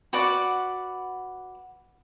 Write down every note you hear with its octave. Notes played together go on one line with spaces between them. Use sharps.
F#4 B4 D5 F#5